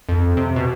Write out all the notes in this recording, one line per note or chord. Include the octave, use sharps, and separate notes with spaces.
F2
C3
B2